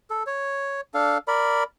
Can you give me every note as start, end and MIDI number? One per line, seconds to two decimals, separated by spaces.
0.10 0.23 69
0.27 0.81 73
0.94 1.18 62
0.94 1.18 69
0.94 1.18 77
1.28 1.63 70
1.28 1.63 74
1.28 1.63 83